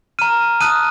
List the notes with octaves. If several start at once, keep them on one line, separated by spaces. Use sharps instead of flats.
A#5 F6 D#7
A5 D#6 F#6 D#7